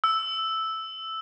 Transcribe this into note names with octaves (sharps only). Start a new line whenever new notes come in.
E6